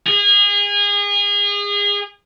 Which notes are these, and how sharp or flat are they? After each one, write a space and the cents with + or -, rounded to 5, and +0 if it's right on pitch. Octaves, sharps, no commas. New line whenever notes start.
G#4 -30